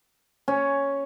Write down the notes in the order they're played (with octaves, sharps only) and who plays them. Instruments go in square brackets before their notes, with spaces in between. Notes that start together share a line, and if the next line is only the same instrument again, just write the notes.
[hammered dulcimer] C#4